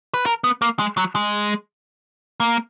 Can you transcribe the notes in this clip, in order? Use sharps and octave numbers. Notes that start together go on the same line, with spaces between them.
B4
A#4
B3
A#3
G#3
F#3
G#3
A#3